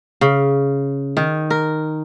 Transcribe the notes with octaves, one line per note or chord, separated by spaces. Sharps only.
C#3
D#3
A#4